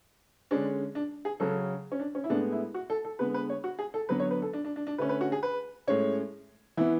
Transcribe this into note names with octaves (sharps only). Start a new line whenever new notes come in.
D3 G#3 C#4 D4
D4
G#4
C#3 F#3 C#4 A4
C#4
D4
C#4
E4
A2 G#3 B3 D4
E4
F#4
A4
A4
D3 G#3 B3 B4
B4
C#5
F#4
G#4
A4
D3 F#3 B3 B4
C#5
B4
A4
D4
D4
D4
D4
D3 A3 C#4 B4
B4
F#4
G#4
B4
A2 G#3 C#4 C#5
E3 B3 E4